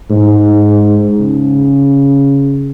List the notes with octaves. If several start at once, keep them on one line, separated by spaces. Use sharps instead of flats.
G#2
C#3